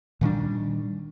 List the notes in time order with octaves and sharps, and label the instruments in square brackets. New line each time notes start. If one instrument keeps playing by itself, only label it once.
[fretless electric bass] A#2 D#3 G3 D4